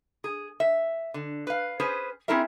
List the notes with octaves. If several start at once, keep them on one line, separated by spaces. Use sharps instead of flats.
G#4
E5
D3
B4 F5
C#4 G#4 B4 C5
C4 C#4 E4 G#4 A#4 E5